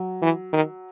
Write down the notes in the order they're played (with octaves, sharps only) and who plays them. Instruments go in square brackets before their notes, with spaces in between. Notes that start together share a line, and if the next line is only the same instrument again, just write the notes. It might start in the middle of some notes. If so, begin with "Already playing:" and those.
Already playing: [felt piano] F#3
[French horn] E3
D#3